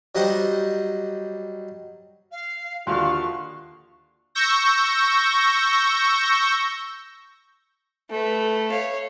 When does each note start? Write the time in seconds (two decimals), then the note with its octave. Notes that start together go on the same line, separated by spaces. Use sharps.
0.15 F#3 G3 D#4 C5 D#5 F#5
2.31 F5
2.87 D#2 D3 F3 E4 F#4 F5 C6 C#6
4.35 C#6 E6 G6 A#6
8.10 A3 B4
8.71 C#5 F5